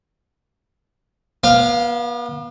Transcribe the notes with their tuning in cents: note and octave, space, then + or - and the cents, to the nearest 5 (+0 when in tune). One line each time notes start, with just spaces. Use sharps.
B3 -40 F5 +0